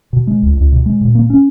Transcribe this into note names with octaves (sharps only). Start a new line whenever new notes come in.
B2
G#3
C#2
C#2
B2
G#3
A#2
A#3
C#4